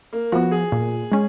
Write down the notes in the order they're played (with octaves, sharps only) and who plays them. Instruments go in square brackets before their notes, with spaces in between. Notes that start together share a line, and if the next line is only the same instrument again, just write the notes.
[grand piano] A#3
[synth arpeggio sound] F3 B3 [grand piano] F#4
[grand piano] G#4
[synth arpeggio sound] A#2
G#3 C#4